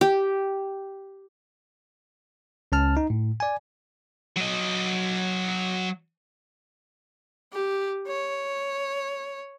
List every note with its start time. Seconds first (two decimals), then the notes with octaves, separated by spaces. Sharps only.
0.01 G4
2.72 C#2 C#4 A5 F6
2.97 D#4
3.10 A2
3.40 D5 G#5
4.37 F#3 D#5
7.53 G4
8.08 C#5